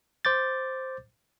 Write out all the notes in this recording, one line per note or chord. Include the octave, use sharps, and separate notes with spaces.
C5 D6 G6 A6